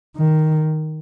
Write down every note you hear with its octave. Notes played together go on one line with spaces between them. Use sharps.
D#3